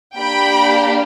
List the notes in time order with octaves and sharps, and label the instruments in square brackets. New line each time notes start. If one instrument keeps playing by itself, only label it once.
[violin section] A#3 D4 G4 G5 B5